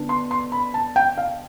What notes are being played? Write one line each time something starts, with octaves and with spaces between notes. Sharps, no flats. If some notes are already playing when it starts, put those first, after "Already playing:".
Already playing: D3 B3 D4
C6
C6
B5
A5
G5
F5